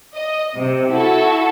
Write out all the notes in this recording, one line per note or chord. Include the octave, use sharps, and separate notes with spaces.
D#5
C3
E4 F#4 A4